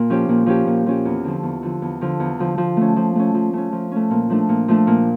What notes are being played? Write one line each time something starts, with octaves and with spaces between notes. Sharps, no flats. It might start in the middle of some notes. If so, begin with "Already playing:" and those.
Already playing: A#2
F3 C#4 G4
A#2
F3 C#4 G4
A#2
F3 C#4 G4
E2
D3 F3
E2
D3 F3
E2
D3 F3
E2
D3 F3
F3
A3 C#4
F3
A3 C#4
F3
A3 C#4
F3
A3 C#4
A#2
F3 A3 D4
A#2
F3 A3 D4
A#2